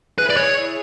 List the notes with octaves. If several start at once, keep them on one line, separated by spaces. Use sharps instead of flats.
E4 G#4 B4
D5
C#5